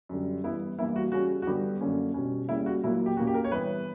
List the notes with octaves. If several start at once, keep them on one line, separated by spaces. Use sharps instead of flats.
F#2 D3 G3
G2 E3 B3 E4
G2 E3 A#3 E4
F#4
C#3 G3 C#4 F#4
F#4
G2 D3 G3 B3 G4
F#2 D3 A#3 C#4
B2 G3 C#4
C#3 G3 A#3 E4
F#4
A#2 F#3 A#3 E4
G4
A#2 A#3 C#4 F#4
G4
A#4
C#5
G2 E3 B3 B4